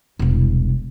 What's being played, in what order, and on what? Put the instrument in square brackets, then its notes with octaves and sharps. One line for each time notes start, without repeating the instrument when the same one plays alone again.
[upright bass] E1 C2